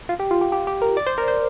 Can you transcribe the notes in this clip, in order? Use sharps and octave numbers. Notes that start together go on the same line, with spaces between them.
F4
G4
F4
G4
G4
G4
A#4
D5
C5
A#4
C5